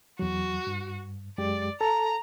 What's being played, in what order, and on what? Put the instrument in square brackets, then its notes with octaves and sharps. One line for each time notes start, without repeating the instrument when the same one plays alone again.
[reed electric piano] E2 F#3 [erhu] F#4
[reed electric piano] G2
[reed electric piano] F#2 G#3 G4 [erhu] D5
[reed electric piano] A4 A5 [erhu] A#5